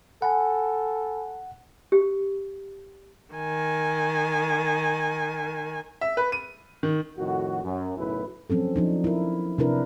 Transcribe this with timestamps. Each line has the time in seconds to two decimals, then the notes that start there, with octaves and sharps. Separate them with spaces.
0.22 A4 F#5 G#5 B5
1.92 G4
3.35 D#3 G#5
6.01 E5
6.17 B4
6.32 D#7
6.83 D#3
7.18 F2 A2 D#3 F#4
7.64 F#2
7.97 B1 F#2 A2 C#3 E4 B4
8.50 F3 F#3 C4 C#4 A4
8.76 F3 D4 D#4
9.04 E4 A#4
9.58 C3 C4 D4 E4 A#4 B4